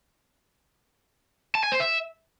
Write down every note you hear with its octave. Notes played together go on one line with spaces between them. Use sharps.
A5
G#5
C5
E5